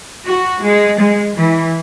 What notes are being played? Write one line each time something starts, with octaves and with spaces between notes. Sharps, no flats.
F#4
G#3
G#3
E3